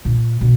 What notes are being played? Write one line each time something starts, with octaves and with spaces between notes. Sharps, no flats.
A#2
B2